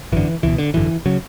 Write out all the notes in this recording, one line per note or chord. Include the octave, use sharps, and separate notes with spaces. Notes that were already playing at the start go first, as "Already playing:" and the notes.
G#1 F#2 D3 E3
C#2 B2 E3
D3
G#1 F#2 D3 E3
C#3 F#3